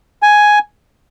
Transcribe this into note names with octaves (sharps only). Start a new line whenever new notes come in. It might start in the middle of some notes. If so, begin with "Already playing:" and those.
G#5